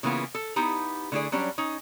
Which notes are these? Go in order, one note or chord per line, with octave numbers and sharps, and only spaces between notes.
C#3 E3 A#3 B3 F4
A4
B3 D#4 E4 G4
D3 A3 E4 G#4 D5
F#3 G3 C#4 D4
C#4 D#4